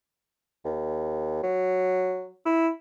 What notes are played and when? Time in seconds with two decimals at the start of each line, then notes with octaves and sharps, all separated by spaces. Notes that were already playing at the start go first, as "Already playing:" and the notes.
0.65 D#2
1.43 F#3
2.46 E4